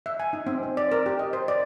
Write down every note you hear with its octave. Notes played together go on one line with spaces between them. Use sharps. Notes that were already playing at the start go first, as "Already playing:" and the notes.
E5
G#5
D#4
C4
C5
D5
A#4
G4
D#5
C5
D5